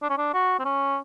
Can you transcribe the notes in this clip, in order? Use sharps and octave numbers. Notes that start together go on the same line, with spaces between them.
D4
C#4
D4
F#4
C4
C#4